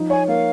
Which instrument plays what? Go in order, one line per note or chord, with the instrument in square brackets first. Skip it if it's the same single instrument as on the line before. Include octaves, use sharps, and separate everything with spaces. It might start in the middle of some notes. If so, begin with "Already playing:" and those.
Already playing: [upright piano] F3 D#4
[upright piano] C#5 [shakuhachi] G#5
[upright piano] A#3 [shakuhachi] F5